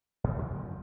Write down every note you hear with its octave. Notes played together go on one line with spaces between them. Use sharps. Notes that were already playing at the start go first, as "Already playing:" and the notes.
G2 B2 D3
G2 G#3 B3
F#1 F#2 D3 F3